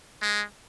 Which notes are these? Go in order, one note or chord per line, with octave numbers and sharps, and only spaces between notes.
G#3